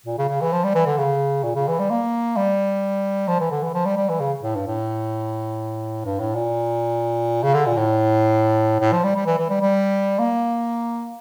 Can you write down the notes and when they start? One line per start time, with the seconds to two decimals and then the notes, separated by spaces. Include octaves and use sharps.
0.06 A#2
0.18 C#3
0.29 C#3
0.41 E3
0.53 F3
0.64 G3
0.75 E3
0.86 D3
0.98 C#3
1.44 A#2
1.56 C#3
1.68 E3
1.79 G3
1.90 A#3
2.37 G3
3.28 F3
3.40 E3
3.51 D3
3.63 E3
3.74 F3
3.85 G3
3.97 G3
4.09 E3
4.20 C#3
4.43 A2
4.56 G2
4.67 A2
6.05 G2
6.20 A2
6.35 A#2
7.43 C#3
7.54 D3
7.66 A#2
7.77 A2
8.81 A2
8.92 F3
9.04 G3
9.16 G3
9.26 E3
9.39 E3
9.50 G3
9.61 G3
10.19 A#3